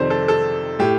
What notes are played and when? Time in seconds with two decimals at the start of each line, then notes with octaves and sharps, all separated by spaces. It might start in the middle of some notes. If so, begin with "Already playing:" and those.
Already playing: F2 C3 D#3 C5 D5
0.10 A4
0.28 A4
0.79 A2 G4